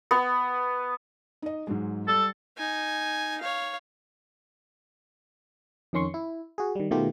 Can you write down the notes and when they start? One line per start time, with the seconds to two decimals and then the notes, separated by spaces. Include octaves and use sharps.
0.11 B3
1.42 D#4 D#5
1.67 G#2 F#3 G#3
2.08 G3 A4
2.58 D#4 G#5
3.41 C#5 F5
5.93 F2 D#3 C#4 C6 C#6
6.14 E4
6.58 F#4 G#4
6.75 D#3 G3
6.91 B2 D#3 A3 B3 F4 G4